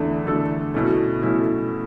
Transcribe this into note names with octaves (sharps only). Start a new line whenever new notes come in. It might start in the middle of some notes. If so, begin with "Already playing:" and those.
Already playing: E2 D3 A3 D4 A4
E2 D3 A3 D4 A4
B2 A3 C#4 E4
B2 A3 C#4 E4